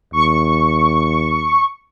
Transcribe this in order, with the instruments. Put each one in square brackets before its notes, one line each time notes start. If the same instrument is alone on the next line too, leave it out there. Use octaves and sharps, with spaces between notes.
[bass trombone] D#2 [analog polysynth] C#6